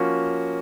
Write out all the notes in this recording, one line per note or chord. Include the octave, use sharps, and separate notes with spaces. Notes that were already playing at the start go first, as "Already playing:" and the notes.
Already playing: F3 A#3 C#4 F#4